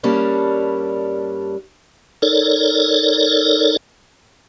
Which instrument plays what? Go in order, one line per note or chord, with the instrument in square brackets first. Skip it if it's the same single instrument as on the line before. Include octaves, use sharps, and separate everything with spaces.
[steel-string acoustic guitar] G2 G3 A#3 C#4 D4
[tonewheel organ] D#4 A4 A#4 C#5 D5